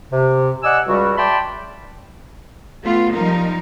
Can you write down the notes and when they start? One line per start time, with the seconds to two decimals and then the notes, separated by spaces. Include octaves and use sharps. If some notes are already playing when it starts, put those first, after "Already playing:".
0.12 C3
0.63 D5 D#5 F#5 G#5 E6
0.86 C#2 G3 F#4
1.18 D5 E5 G5 A5 B5 C6
2.83 A3 B3 F4
3.13 F3 G3 D#4 A#4